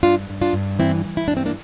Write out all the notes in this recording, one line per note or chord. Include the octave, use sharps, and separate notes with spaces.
G2 D4 F4
G2
D4 F4
G2
E3 C4 E4
E3
E4
G2 D4
C4
A#3 D4